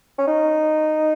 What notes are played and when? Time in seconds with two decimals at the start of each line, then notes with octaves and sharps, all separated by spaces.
0.19 C#4
0.28 D#4